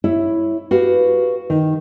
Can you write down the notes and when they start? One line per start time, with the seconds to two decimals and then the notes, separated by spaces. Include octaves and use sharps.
0.04 E4 C#5 E5
0.71 F#4 G4 B4 F5
1.50 D#3